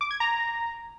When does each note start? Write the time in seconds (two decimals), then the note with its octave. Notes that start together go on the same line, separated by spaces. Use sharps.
0.01 D6
0.11 G#6
0.20 A#5